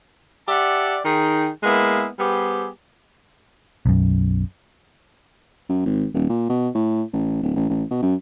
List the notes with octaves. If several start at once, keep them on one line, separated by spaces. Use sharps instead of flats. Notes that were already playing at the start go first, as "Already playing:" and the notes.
G4 D5 E5 F#5 A5
D#3 D#4 G#4 G5
G#3 A#3 B3 E4 F5
G3 B3 G4 G#4 C5
B1 F#2
F#2
G#1
D#1
A#2
B2
A2
A1
D1
A1
A1
B2
F#2